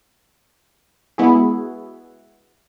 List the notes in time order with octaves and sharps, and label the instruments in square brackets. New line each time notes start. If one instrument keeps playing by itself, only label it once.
[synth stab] G#3 B3 E4 F#4 G#4